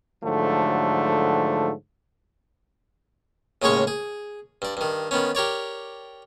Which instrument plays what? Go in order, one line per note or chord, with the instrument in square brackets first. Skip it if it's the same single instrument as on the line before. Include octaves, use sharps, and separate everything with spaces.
[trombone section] G#2 D3 F3 F#3 A3
[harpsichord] D#2 A2 C#3 G#3 C#5 C#6
G#4
G2 D5
G2 D#3
D#3 B3 C#4
G4 A#4 C#5 D5